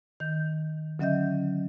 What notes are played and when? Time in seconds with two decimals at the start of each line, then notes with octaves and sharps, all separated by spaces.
0.20 D#3 G6
0.99 D3 F#3 C#4 D#5 E5 G6